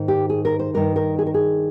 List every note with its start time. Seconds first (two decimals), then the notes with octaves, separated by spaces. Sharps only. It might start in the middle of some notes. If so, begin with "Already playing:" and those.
Already playing: G#2 D#3
0.08 G4
0.30 G#4
0.45 A#4
0.59 C5
0.74 G2 D#3 A#4
0.96 A#4
1.19 G#4
1.26 A#4
1.34 G#4